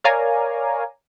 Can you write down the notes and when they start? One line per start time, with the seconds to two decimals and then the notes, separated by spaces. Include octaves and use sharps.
0.04 A#4 C#5 D5 F5 G#5 A#5